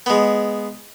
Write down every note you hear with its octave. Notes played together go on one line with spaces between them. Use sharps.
G#3 B3